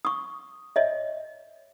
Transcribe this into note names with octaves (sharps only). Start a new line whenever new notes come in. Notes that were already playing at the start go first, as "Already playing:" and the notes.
C#6 D#6
C#5 D#5 E5